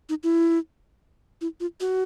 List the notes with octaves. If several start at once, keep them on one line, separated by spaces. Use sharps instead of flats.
D#4
E4
E4
F4
F#4